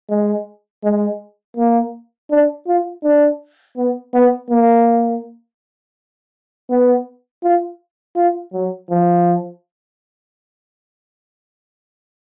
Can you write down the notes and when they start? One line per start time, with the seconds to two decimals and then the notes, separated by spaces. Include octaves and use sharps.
0.10 G#3
0.84 G#3
1.57 A#3
2.31 D4
2.67 F4
3.03 D4
3.77 B3
4.14 B3
4.50 A#3
6.70 B3
7.43 F4
8.16 F4
8.53 F#3
8.90 F3